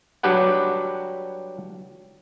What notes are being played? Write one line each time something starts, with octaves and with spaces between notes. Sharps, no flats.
F#3 G3 D4 G4 B4 F#5